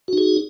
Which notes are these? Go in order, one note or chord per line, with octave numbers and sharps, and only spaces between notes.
D#4 F#4 G#4